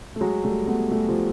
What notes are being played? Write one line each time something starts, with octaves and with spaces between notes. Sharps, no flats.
A3
F#3 G#3
G3 A3
A3 B3
G3 A3
F3 G3